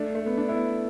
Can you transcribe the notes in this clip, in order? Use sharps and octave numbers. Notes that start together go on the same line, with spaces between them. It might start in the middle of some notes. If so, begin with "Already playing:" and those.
Already playing: A3 D4
A3
B3
D4
B3 E4